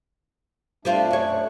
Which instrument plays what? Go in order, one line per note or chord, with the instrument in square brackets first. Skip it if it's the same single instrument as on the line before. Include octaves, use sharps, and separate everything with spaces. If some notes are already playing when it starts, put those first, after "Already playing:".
[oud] G3 C4 F4 [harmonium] A3 D4
[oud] F#2 C#5